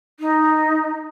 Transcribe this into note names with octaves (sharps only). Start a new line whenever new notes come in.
D#4